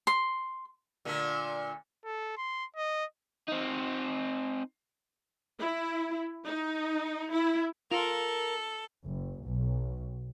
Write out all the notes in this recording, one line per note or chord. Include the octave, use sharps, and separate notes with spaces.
C6
A#2 D3 A3
A4
C6
D#5
C4 D#4
E4
D#4
E4
F4 A4 A#4
F#1
B1